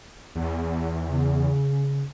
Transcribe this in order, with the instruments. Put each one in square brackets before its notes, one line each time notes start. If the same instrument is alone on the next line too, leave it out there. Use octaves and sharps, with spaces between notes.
[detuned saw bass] E2
[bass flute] C#3